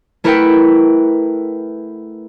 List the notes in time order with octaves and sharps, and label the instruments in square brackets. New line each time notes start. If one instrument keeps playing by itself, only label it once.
[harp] A3 E4 A#4 B4 F#5 G5